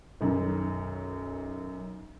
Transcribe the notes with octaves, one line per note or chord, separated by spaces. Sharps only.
B1 F#2 D#3